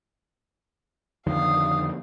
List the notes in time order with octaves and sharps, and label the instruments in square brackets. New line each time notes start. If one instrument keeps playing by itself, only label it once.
[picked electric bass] F2 D3 D#3 [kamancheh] F5 D#6